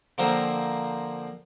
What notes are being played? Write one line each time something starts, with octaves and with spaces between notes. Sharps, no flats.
D3 F3 A#3 C4 A#4 C5